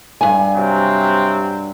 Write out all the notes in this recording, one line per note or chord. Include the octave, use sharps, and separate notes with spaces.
G2 G#5
C3 F#3 C4